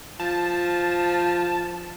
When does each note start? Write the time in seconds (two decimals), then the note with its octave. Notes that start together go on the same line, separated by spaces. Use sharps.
0.20 F3 A5